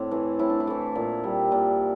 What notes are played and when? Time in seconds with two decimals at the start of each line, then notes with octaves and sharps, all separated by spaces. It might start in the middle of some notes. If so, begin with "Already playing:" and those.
Already playing: A2 C4 D4
0.11 E3 A3
0.39 A2 E4
0.50 D4
0.60 E4
0.67 E3 A3
0.95 A#2
1.24 G3
1.52 A#2